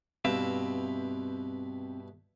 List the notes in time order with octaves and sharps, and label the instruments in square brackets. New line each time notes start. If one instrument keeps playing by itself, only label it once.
[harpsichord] G2 B2 E4 [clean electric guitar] C4 E5 F5